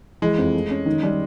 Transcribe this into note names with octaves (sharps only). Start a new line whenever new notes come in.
E3 G#3
F2
A3
C#4
D#3
G3